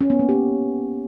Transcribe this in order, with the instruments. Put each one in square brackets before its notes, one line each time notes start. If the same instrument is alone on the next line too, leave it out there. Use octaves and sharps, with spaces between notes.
[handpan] C#4
B3
A#3
G4